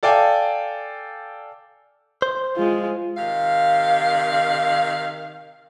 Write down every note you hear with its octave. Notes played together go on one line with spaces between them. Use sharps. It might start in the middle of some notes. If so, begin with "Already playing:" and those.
A4 D5 F5 G5 G#5
C5
G#3 F4
C3 D#3 F5